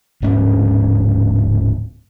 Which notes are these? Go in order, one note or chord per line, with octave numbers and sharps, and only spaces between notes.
D1 G#2 C#4